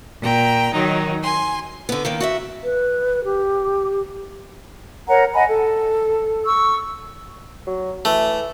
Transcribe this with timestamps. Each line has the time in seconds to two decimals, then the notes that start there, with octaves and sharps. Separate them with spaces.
0.22 A#2 G5 A#5
0.73 D#3 F#3 D#4
1.21 G#5 C6
1.89 D3 B3
2.05 D#3 A#3 D4
2.20 F#4 D#5 E5
2.64 B4
3.24 G4
5.08 A#4 C#5 F#5 A#5
5.34 D#5 F#5 G#5 B5
5.48 A4
6.45 C#6 E6
7.67 F#3
8.05 E3 A3